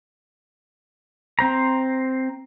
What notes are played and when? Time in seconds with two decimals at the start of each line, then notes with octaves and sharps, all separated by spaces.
1.39 C4 C5 A#5